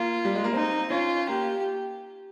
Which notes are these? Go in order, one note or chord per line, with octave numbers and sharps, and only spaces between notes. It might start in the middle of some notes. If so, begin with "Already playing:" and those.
Already playing: A#3 F4
G3
G#3
A#3
C4 D#4
C#4 F4
A#3 G4